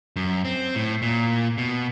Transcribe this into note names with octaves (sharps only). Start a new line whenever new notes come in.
F#2
C4
A2
A#2
B2